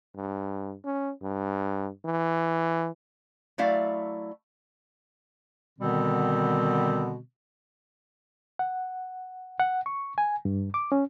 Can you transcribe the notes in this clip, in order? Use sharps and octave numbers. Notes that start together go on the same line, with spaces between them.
G2
C#4
G2
E3
F#3 A3 E4 D5 F5
B2 D3 D#3 G3 B3 C4
F#5
F#5
C#6
G#5
G2
D6
C#4